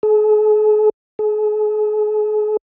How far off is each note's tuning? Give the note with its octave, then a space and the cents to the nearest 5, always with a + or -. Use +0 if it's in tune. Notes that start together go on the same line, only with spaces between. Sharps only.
G#4 +45
G#4 +40